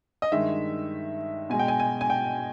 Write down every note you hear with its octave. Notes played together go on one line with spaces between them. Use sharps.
D#5
G2 D#3 G#3 E5
B2 G#3 G#5
G5
G#5
G#5
G#5
G5